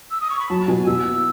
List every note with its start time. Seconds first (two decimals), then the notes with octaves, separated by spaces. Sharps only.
0.11 E6
0.21 D#6
0.30 C#6
0.39 B5
0.49 F#3 A5
0.67 B2 G#5
0.87 B2 E6
1.06 E4